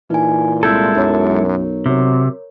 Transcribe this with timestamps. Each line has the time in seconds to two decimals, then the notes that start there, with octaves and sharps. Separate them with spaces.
0.10 A#2 E3 D#4 G#5
0.63 C2 G#3 E4 A4 E6 G6 G#6
0.95 B1 F#2 A#4 C#5
1.86 C3 F#3